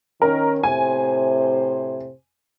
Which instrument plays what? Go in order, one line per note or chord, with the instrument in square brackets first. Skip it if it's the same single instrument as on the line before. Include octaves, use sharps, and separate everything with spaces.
[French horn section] D#3 C#4 [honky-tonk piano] A#4
[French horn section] A2 C3 C5 [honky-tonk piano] G#5